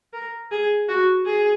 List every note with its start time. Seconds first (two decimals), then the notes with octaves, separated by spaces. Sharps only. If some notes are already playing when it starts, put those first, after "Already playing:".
0.13 A#4
0.51 G#4
0.88 F#4
1.26 G#4